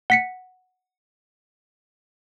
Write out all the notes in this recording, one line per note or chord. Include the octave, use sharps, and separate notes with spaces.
F#5 B6 C#7